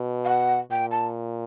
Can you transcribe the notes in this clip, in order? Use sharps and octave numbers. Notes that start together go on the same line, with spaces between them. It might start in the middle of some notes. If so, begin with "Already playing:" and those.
Already playing: B2
F5
F#5
A#2 G5
A5